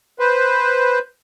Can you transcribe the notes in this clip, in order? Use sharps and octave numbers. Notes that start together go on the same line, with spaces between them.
B4 C5